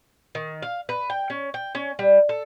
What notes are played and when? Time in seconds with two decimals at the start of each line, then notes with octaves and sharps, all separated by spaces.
0.35 D#3
0.62 F5
0.89 B4
1.10 G5
1.30 C#4
1.54 G5
1.75 C#4
1.99 G3
2.29 A4